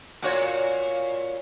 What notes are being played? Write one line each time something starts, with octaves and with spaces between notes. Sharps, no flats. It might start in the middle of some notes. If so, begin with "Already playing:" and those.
A#2 F#4 C#5